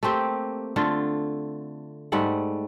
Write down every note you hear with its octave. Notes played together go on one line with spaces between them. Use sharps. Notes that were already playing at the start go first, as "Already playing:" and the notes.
A3 A#3 C4 G4
D3 A3 F4
G#2 G3 A3 F#5